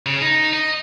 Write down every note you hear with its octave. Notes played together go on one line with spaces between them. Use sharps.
C#3
D#4
D#5